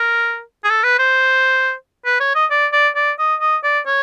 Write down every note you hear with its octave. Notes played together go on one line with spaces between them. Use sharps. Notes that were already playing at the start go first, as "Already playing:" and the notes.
Already playing: A#4
G#4
A4
B4
C5
B4
C#5
D#5
D5
D5
D5
D#5
D#5
D5
C#5